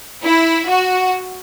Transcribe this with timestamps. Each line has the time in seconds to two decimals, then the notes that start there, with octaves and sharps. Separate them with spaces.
0.24 E4
0.69 F#4